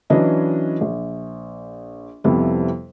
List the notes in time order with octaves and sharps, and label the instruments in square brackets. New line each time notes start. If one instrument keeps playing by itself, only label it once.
[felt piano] E3 F#3 C#4 D4 B4 D#5
A#1
F2 C3 G3 B3 E4